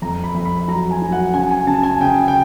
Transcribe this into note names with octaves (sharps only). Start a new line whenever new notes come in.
F2 A#5
B5
F2
B5
F#3 A#5
G#5
F#3
F#5
C#3 G#5
G#5
C#3 A5
G#5
C#3 G5
G5